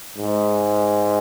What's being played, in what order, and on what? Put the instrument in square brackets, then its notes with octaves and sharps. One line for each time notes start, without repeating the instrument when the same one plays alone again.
[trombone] G#2